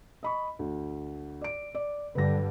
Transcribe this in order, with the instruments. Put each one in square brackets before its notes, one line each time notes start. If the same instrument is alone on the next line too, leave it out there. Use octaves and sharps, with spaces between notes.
[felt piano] D#5 B5 C#6
D2
D5 D7
D5
[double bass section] G2 D3 G3 [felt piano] B4 A#6